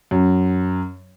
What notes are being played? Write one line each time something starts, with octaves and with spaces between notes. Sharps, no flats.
F#2